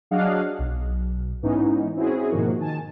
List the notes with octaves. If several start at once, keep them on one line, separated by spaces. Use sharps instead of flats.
F#3 D4 G#4 D#5 F5 F#5
B1
G#2 E3 B3 C#4 D#4
C4 C#4 E4 F#4 G#4
G#2 B2 D#3 F3 A#3 F#4
D#3 G#5 A5